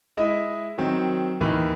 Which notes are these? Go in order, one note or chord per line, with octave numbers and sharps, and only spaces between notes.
G#3 E4 D#5 E5
D#3 F#3 C4
D#2 D#3 E3